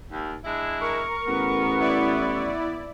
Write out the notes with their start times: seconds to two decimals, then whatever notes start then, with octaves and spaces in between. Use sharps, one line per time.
0.12 D#2
0.44 G#3 D4 E4
0.81 A#4 C#6
1.27 A1 B3
1.79 E4 D5